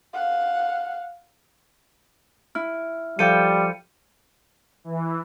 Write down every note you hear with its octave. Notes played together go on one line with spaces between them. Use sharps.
F5 F#5
E4 F6
F3 G3 A4 G5 C#7 D#7
E3